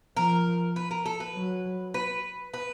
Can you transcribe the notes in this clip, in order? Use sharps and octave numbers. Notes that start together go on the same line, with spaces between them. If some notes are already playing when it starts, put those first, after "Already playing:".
F3 A#4
B4
A#4
A4
B4
F#3
B4
B4